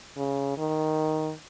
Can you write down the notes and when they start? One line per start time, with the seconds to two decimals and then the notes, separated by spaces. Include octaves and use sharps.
0.17 C#3
0.58 D#3